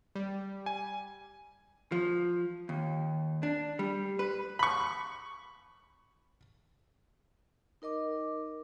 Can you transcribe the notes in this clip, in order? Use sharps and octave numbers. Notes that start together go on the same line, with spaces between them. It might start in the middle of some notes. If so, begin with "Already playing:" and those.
G3
G#5
F3
D#2
D4
G3
B4
B5 C#6
D#4 A#4 D#5 D6